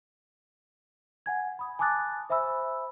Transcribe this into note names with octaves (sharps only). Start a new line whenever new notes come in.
F#5 G#5 G#6
B5 D#6
G#5 A5 D6 D#6 F#6 A6
C5 E5 G#5 B5 E6